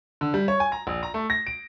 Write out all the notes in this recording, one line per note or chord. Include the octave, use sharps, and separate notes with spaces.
D3
G3
C#5
G#5
A#5
A#1
A#5
A3
A#6
D7